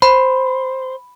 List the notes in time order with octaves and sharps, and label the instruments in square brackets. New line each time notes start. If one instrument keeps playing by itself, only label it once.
[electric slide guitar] C5 [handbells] B5